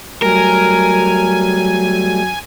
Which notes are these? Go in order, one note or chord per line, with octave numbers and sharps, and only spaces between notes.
F#3 G3 A3 A#4 G#5